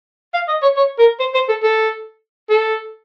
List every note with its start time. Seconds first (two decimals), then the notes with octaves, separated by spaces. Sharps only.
0.34 F5
0.48 D#5
0.62 C#5
0.76 C#5
0.98 A#4
1.20 C5
1.34 C5
1.49 A4
1.63 A4
2.50 A4